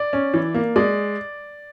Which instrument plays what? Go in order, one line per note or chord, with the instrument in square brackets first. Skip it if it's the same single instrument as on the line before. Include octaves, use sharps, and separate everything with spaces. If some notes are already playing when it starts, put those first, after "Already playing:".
Already playing: [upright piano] D5
C#4
E3
A#3
G#3 D5